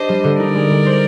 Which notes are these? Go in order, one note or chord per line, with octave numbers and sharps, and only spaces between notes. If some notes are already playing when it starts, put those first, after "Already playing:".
Already playing: D4 G4 C5 D#5
G3
D3
D#4 A#4 D5
G#3
G#3
C5